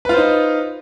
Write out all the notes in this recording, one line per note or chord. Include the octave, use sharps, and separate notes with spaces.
D#4 F4 B4 C5